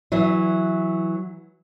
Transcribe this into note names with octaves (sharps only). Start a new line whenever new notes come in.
E3 F#3